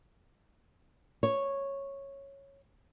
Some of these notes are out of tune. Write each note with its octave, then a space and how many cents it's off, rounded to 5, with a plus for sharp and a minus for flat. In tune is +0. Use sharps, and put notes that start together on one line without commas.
C#5 -5